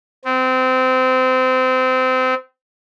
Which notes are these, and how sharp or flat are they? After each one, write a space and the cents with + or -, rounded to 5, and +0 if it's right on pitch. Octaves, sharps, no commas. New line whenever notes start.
C4 -25